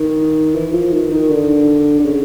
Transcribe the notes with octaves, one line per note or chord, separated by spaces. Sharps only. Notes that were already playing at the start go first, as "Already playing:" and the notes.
Already playing: D#3
E3
F3
D#3
D#3
D3
D3
C#3